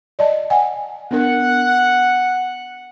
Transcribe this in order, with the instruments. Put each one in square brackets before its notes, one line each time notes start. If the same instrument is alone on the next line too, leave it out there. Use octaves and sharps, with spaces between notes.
[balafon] D5 D#5 A5
F#5 G#5
[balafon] B3 D4 A#4 [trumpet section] F#5